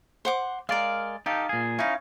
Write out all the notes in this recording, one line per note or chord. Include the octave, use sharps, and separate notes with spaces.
C5 F#5 D6
G#3 A#4 D5 F5
D#4 G4 A4 F5
A#2 G#4
C#4 D#4 E4 F5